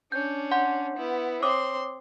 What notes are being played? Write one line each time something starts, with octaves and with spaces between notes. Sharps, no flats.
C#4 D4 G6
F#5 C6 G6
B3 E4
C4 C#5 C6 D6 D#6